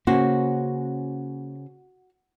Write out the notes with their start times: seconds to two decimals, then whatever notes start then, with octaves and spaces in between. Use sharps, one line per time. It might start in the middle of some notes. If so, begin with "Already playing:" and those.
0.07 C#3 A#3 C#4 F#4 C5